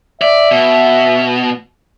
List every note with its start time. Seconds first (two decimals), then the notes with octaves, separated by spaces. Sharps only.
0.21 D5 E5
0.51 B2